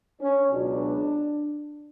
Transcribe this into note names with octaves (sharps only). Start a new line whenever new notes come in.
C#4
C#2 B2 F#3 D4